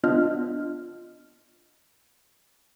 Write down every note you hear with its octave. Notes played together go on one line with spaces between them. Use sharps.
B3 D4 F4 D#5 F6